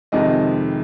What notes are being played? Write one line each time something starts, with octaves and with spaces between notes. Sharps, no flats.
F2 C3 D#3 G#3 D#5